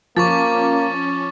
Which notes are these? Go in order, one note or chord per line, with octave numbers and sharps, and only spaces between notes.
F3 A#3 C#4 C#6 D6 A6